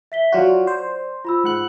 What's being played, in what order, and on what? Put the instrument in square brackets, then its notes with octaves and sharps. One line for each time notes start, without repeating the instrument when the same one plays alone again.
[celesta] E5 B6 G7
[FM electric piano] F#3 F4 F#4 [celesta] D5
[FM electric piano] C5
[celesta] F4 B5 E6
[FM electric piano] G#2 F#5 F#6